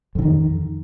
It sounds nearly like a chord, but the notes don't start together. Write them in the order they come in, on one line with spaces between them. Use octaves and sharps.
F2 D3 D#3